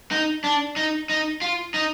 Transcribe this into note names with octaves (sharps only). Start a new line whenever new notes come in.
D#4
D4
D#4
D#4
F4
D#4